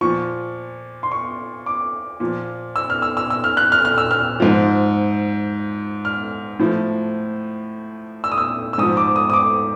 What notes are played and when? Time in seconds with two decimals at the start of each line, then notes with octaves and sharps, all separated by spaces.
0.01 A#2 F3 C#6
1.03 C6
1.12 C#6
1.66 D6
2.20 A#2 F3
2.76 E6
2.90 F6
3.02 E6
3.17 E6
3.30 E6
3.44 F6
3.57 F#6
3.72 F6
3.85 F6
3.98 E6
4.11 F6
4.40 G#2 F3
6.05 F6
6.60 A2 F3
8.24 E6
8.32 D#6
8.38 E6
8.73 E6
8.78 G#2 F3 D#6
8.97 D6
9.16 D#6
9.30 D#6
9.33 D6